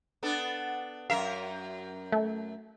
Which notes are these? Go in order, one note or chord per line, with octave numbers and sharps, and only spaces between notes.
B3 D4 A4
F#2 A#4 E5 F5
A3